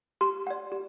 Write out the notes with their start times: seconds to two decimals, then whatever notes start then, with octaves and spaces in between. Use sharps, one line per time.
0.21 G4 C6
0.47 D5 F#5
0.72 G4